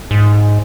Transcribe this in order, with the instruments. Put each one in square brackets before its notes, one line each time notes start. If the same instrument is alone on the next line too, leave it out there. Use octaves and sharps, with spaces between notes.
[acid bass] G#2